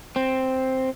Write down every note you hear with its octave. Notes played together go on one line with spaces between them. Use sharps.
C4